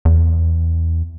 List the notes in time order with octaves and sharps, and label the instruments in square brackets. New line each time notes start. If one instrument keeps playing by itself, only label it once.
[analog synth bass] E2